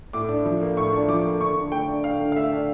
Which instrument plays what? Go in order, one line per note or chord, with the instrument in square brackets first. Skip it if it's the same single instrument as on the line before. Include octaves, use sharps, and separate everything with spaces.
[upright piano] A2 D6
D4
F3
A#3
A2 C#6
D4
F3 D6
A#3
D3 C#6
D3
A3 G5
D4
D3 F5
D3
F5
A3 E5
D4